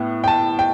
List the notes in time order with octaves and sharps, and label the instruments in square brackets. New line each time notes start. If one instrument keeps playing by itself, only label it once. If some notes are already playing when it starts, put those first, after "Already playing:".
Already playing: [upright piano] A2 B3
G5
A5
G5